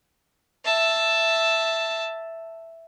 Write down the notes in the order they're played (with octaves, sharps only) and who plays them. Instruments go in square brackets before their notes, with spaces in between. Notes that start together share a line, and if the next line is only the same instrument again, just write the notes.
[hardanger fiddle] E5 A5